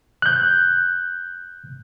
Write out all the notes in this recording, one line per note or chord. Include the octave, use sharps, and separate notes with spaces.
F#6 G6